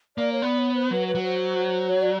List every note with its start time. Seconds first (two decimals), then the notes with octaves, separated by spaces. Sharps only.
0.17 A#3 D5
0.32 C#5
0.42 B3 D5
0.58 C#5
0.75 C5
0.91 F#3 B4
1.08 B4
1.15 F#3
1.23 C5
1.89 C#5
2.02 D5